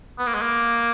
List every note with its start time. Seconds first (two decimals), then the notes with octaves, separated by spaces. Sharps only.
0.19 B3
0.27 A#3
0.35 G#3
0.42 A#3